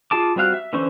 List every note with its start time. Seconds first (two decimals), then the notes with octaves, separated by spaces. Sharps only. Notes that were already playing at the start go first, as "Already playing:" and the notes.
0.11 F4 G#4 A5 D6
0.36 G3 C4 F#4 F5 F#6
0.54 E5
0.73 D3 E3 C#4 C5 C#6